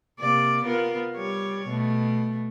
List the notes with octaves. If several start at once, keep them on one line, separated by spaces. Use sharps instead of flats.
C3 A#3 D5
B3 F4 A#4
G3 C#5
B2 A3